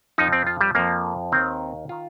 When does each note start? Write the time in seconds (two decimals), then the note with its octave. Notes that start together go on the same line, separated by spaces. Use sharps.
0.18 F2 F3 D#4
0.33 C4
0.47 F4
0.61 G3
0.75 F2 F3 A#3
1.32 D#2 D#3 C4
1.89 D#3 F4